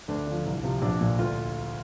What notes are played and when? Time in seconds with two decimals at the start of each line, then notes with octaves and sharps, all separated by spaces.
0.08 D2 D4
0.27 D3 F3
0.46 C2
0.64 C3 F3
0.81 A#1 D4
1.01 A#2 F3
1.19 D2 F4